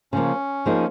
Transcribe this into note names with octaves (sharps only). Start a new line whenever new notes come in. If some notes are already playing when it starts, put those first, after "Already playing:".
C#3 F3 A#3 C#4
F3 A#3 D#4 G#4